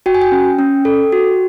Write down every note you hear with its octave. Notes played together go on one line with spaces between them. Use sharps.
F#4 G5
G#5
G5
C#4
C#4
A4
F#4